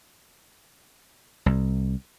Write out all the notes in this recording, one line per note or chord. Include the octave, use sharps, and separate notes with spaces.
C2